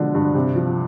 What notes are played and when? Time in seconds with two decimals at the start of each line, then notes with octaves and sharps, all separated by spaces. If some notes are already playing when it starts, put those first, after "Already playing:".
Already playing: B2 D3 F3 G#3
0.15 G2
0.35 C3
0.56 F3